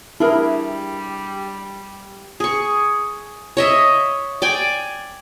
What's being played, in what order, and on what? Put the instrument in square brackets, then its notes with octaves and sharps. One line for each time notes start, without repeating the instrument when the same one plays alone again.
[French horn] G3 [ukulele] D4 G#4 A#4 [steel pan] E4
[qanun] G#4 C#6
C#5 D#5 E5
D5 G5 G#5